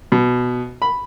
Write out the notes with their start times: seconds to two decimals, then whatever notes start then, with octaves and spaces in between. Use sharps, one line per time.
0.12 B2
0.82 B5